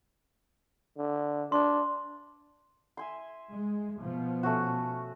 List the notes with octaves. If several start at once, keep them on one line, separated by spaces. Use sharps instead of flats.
D3
D4 C6
E5 G#5 C6
G#3
B2 F3 B3
A3 C#4 F#4